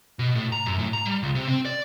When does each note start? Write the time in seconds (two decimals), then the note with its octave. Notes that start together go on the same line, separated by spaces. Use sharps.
0.19 B2
0.35 A2
0.52 A#5
0.67 F#2
0.79 A2
0.93 A#5
1.06 G3
1.23 C#2
1.35 C3
1.48 C4
1.65 D5